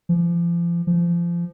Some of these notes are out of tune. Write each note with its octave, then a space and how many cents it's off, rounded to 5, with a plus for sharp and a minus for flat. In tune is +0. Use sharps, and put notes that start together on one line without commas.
F3 -35
F3 -25